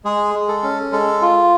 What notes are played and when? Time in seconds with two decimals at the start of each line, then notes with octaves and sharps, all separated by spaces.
0.04 G#3 G#4
0.34 G#3
0.48 A4
0.63 C#4
0.92 G#3 A4
1.22 F4